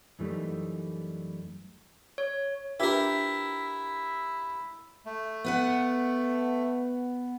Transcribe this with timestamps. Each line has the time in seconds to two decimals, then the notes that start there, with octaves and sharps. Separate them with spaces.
0.19 F#2 E3 G3 A3 D#4
2.18 C#5
2.80 D4 E4 F4 G4 A#4 B4 E5
5.06 A3
5.44 B3 B4 F#5